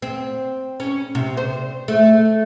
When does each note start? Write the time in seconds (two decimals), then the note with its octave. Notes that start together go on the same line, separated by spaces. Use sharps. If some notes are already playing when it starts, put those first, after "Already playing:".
0.02 C4
0.80 C#4
1.15 C3
1.37 C5
1.88 A3